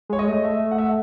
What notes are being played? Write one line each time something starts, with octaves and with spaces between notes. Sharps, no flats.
G#3 C#5
D#5
A3
E5
F#5
E5
F#5